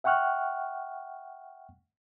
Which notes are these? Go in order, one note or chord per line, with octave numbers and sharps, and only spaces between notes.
E5 F#5 G5 C#6 F6 F#6